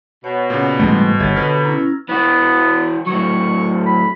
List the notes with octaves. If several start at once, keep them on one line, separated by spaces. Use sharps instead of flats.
B2 C#5 F#5
A#2 C#3
G#2 E3 G3 A3 C6
G1 G4 C#5 G#6 A6
D3 B4 F6 G#6
C#4 E4 A#5 E6
E3 B3 F#4
A2 F#3 C#6
B5